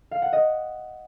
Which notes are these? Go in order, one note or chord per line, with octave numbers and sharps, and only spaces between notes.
F5
F#5
D#5